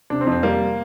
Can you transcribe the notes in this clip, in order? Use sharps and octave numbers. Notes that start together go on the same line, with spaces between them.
C3 D4
C4
F2
C4
G3 A#3